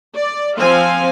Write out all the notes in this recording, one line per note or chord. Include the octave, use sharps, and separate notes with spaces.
D5
F3 C4 F5 G#5